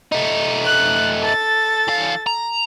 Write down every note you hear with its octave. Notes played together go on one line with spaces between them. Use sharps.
A3 D#4
F#6
A4 A6
E3 F5
A#5